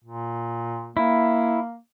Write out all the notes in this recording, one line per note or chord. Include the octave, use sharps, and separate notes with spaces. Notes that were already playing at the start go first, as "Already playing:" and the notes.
A#2
A#3 E4